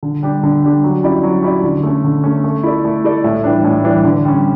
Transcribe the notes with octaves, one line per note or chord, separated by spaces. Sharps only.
D3
G3 D4 G4
D3
G3 D4 G4
F#3
C#4 E4 G4 D5
F#3
C#4 E4 G4 D5
D3
A3 C#4
D3
A3 C#4
A3
E4 A4 D5
A3
E4 A4 D5
A2
E3 G3 D4
A2
E3 G3 D4
D3
G3 C#4